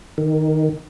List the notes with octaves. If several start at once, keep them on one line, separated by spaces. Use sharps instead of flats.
D#3